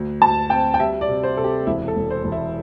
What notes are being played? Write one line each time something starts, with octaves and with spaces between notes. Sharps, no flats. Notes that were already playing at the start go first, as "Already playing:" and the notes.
Already playing: D2
D2 A5
C4 G5
G5
G3 E5
D5
C3
C5
C3 A4
G4
E1 E4
A4
E1
C5
E1
E4